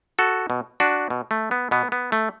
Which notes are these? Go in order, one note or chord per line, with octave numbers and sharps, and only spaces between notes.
F#4 A4
B2
D4 F#4
B2
A3
B3
B2 B3
B3
A3